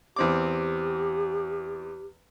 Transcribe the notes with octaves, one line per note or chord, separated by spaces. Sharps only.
E2 C4 G4 D6